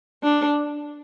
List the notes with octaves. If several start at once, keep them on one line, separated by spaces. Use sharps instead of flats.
D4